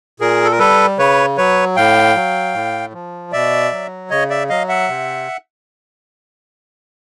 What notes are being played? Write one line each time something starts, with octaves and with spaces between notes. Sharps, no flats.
A#2 G#4 A#4
A4
A#4
G3 A4 B4
C#3 B4 C#5
F#3 B4 C#5
A2 F5 G5
F#3
A2
F3
B2 D5 E5
F#3
C#3 C#5 D#5
D5 E5
F#3 D#5 F5
E5 F#5
C3